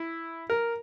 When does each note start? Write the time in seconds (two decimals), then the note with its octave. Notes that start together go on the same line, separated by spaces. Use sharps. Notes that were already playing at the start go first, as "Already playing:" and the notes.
Already playing: E4
0.50 A#4